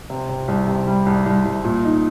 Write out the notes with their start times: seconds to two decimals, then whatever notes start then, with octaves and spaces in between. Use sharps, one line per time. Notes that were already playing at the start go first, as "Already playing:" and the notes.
0.10 C3
0.29 C3
0.48 C2
0.67 C3
0.87 G3
1.06 C2
1.25 C2
1.45 C2
1.64 A#2
1.84 D#4